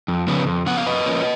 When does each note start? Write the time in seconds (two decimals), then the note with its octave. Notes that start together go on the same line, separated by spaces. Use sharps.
0.08 F2
0.27 C#3 F3 B3
0.47 F2
0.66 C#3 F3 B3 F#5
0.77 F5
0.86 F#2 B4 D#5
1.06 F3 A#3 C#4